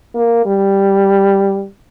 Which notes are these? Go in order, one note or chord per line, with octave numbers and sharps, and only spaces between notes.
A#3
G3